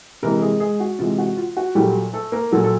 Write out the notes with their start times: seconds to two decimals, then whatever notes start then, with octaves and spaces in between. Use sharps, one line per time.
0.23 C3 E3 G#3 A#3 A#4
0.42 G#3 G#4
0.60 G#3 G#4
0.80 F#4
0.99 C3 E3 G#3 F4
1.18 F#4
1.37 F4
1.57 F#4
1.75 A#2 F#3 G3 A3 G4
2.13 A3 A4
2.32 A#3 A#4
2.51 A#2 F#3 A3 A4
2.64 A4